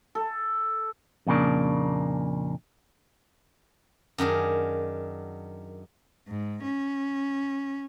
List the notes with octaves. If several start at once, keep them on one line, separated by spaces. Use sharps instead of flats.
A4
F2 A#2 C#3 A#3 D4
F#2 D#3 D4 G#4
G#2
C#4